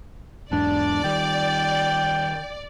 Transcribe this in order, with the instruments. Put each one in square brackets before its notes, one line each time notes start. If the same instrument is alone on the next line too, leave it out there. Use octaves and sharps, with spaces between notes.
[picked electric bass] E2 G#2 [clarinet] D4 [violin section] D5
[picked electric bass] D#3 G3 [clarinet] G5